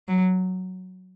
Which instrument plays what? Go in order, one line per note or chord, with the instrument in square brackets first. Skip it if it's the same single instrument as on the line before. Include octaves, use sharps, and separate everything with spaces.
[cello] F#3